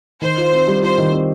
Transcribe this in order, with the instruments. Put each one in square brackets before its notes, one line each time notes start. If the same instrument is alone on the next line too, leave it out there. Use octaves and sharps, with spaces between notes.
[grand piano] D#3 [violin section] C5
[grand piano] F4
C4
G3
[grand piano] F4 [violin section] C5
[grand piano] D#3
C4